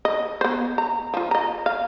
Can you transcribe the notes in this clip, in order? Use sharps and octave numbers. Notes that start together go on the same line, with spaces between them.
D#5
B3 C5
A#5
F3 F4
D#5 A#5
F5